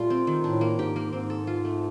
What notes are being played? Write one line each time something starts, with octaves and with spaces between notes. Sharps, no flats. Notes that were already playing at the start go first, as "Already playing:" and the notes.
Already playing: A#2 G3 A3 F4
C4
D#3
A2 D4
A#3
G#2 G4
A#3
G#2 C4
A4
F4
A3